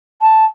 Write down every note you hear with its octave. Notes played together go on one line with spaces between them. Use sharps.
A5